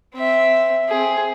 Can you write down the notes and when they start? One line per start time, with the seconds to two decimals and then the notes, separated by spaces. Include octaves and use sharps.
0.15 C4 E5
0.89 C4 G#4